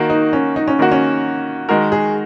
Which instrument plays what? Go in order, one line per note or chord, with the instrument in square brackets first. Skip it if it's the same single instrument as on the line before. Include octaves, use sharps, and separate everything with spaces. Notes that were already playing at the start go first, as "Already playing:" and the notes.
Already playing: [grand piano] D#3 A#3 F#4
[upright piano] D#4
C#4
D#4
C#4
[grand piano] D#3 A#3 F#4
[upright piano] C#4
[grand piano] D#3 G#3 F#4 A#4
[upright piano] G#4